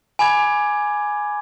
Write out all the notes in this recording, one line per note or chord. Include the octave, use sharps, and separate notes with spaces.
G#5 B5 D6 G#6